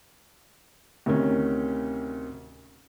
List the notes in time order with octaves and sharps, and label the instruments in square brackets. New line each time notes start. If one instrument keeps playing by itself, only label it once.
[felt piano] D2 C3 D#3 C#4